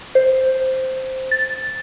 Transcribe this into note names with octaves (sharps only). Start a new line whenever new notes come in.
C5
A6